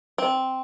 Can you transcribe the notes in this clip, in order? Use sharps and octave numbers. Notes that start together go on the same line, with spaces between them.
C4